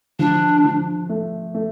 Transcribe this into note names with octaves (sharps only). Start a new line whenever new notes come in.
F3 D4
F3
A3
A3